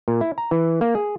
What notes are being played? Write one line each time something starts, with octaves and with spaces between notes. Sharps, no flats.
A#2
E4
A#5
E3
A#3
G#4